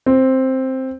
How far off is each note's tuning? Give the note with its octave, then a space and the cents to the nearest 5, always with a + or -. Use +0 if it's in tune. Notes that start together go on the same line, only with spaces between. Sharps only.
C4 +5